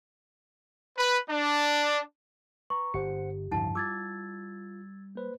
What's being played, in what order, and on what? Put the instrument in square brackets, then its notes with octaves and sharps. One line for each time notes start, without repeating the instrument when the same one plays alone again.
[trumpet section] B4
D4
[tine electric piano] B4 A#5 [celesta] C#6
[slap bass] G1 [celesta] G4 [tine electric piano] C5 F#5 C#7
[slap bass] D1 C#3 [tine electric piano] G2 F3 G3 [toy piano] E4 F#5 A5
[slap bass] G3 [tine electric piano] F4 [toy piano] D6 [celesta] E6 G#6 A6
[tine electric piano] A#3 B4 C5